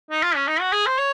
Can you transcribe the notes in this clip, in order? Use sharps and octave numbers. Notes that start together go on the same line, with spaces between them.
D#4
F4
C#4
D#4
F#4
G#4
C5
C#5